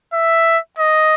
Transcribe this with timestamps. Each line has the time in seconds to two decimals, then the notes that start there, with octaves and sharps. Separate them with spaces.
0.14 E5
0.79 D#5